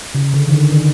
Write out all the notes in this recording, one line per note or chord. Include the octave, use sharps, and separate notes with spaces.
C#3
D3
D#3
D3
D#3